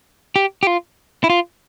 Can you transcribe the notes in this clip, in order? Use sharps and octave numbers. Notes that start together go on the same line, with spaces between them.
G4
G4
F4
E4
F4